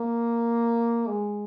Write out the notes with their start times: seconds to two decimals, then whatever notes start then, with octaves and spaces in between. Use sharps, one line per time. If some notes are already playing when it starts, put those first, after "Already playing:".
Already playing: A#3
1.06 G#3